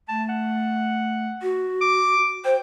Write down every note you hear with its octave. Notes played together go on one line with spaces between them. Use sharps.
A3 A5
F#5
F#4
D6
C5 G5